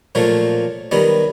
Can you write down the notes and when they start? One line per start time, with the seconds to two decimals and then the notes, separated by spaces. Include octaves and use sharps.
0.15 A#2 F3 F#3 A3
0.91 D#3 F#3 G3 B3